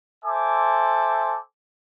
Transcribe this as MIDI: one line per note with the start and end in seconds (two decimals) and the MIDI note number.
0.24 1.37 69
0.24 1.37 72
0.24 1.37 76
0.24 1.37 80
0.24 1.37 86